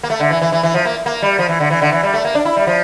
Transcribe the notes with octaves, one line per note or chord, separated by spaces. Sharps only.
A#3
A3
D3
E3
E3
E3
E3
F3
A#3
A#3
G3
F3
E3
D3
E3
D3
E3
G3
A3
A#3
D4
E4
G3
F3